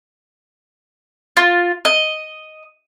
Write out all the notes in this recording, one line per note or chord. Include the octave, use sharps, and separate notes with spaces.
F4
D#5